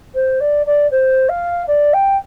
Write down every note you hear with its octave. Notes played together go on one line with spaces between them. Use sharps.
C5
D5
D5
C5
F5
D5
G5